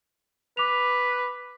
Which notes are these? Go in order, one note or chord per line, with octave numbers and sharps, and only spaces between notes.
B4 D6 F7